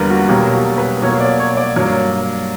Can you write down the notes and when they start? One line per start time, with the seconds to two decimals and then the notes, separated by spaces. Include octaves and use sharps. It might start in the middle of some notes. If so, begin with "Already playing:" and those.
Already playing: E2 D3 G3 A#3 A#4 B4
0.10 F#4
0.29 B2 F#3 A#3 G4
0.53 F#4
0.78 B4
1.02 B2 F#3 A#3 C#5
1.21 D5
1.39 C#5
1.57 D5
1.76 G2 F#3 A#3